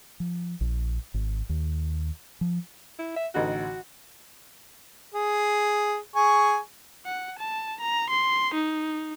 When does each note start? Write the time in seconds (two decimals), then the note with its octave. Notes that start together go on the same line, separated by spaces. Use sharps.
0.20 F3
0.61 A#1
1.14 G#1
1.49 D#2
2.41 F3
2.99 E4
3.16 E5
3.35 A1 D3 D#4 F#4
5.14 G#4
6.15 G#4 G#5 C#6
7.06 F#5
7.39 A5
7.81 A#5
8.10 C6
8.54 D#4